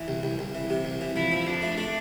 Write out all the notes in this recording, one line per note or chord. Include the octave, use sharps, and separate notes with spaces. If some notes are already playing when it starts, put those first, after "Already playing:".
Already playing: E3
C2
C2
C2
E3
C3
C2
E3
F3 E4
F3 E4
F2 D4
A3
A3 D4